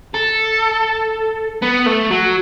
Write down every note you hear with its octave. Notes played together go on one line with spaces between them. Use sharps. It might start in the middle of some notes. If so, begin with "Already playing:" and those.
A4
B3
A3
F#3